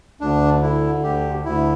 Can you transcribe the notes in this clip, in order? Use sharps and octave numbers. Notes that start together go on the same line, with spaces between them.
D2 D4
D3 E4
D2 G4
D2 E4